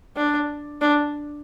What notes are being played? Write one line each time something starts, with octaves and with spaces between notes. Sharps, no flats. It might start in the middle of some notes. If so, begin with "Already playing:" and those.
D4
D4